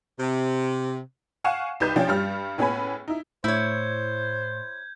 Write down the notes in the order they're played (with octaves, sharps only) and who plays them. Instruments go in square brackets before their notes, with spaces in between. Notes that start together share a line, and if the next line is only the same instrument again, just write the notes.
[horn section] C3
[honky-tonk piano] F5 F#5 G#5 C#6 C7 E7
C2 D#4 B4 G6 E7
F3 C#4 D4 G5 A6
G2 G3 F6
A2 B3 C#4 G#4 G#5 B5
D#4 E4
[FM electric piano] A2 [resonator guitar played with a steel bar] E4 C#5 [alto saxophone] C5 [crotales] G6 G#6